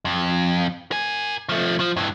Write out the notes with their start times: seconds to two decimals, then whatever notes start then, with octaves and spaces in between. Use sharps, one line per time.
0.05 F2
0.91 A#4 G#5
1.49 F3 A3
1.80 F3
1.97 G2 E3